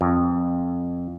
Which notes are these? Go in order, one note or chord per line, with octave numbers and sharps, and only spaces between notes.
F2